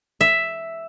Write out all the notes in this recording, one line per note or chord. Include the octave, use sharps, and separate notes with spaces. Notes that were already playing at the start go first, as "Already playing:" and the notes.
E5